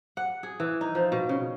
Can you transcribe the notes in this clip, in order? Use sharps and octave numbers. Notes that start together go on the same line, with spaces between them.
F#5
G#4
E3
D#4
F3
B2
C#3